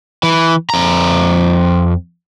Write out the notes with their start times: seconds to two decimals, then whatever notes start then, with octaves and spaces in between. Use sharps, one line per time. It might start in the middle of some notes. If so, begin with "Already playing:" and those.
0.23 E3
0.70 F2 A#5